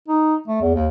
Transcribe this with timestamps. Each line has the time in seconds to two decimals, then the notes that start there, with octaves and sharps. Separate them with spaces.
0.08 D#4
0.48 A3
0.61 E2
0.75 D#2